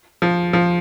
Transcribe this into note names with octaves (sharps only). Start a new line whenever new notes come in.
F3
F3